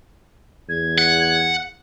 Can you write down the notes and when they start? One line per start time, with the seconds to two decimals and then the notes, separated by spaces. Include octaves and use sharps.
0.69 E2 G#6
0.98 F#5